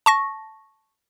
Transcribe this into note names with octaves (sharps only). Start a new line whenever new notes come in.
A5 C#6 A#6